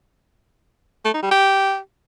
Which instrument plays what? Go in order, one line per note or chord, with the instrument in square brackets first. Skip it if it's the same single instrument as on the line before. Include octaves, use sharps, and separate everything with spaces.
[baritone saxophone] A3
D#4
G3
G4